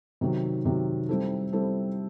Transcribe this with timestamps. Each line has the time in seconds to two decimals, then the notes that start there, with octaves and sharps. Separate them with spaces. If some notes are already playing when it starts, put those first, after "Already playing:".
0.21 C3 D#3 F#3
0.65 C3 D#3 F#3
1.09 G3 C4 E4 A4
1.53 G3 C4 E4 A4